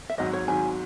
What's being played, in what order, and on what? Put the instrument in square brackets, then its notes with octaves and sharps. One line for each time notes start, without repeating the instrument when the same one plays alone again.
[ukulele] E5
[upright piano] G#1 G#2 F#3 [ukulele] D#5
[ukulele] C#5
[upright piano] G#1 G#2 F#3 [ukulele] G#5